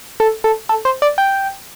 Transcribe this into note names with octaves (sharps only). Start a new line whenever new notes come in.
A4
A4
A4
C5
D5
G5